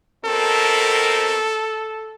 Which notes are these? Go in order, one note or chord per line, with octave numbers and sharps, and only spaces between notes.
B2 C4 A4 A#4